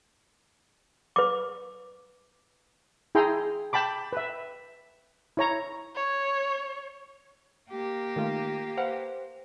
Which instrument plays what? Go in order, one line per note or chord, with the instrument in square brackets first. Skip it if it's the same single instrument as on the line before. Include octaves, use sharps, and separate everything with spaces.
[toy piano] B4 D6
[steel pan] E4 G#4 G5 A#5 C6
G5 A5 B5 D6
B4 E5
E4 C#5 A#5
[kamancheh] C#5
[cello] A#3 G4
[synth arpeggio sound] D#3 A3 F4
[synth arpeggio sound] B4 F5 F#5 [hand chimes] C5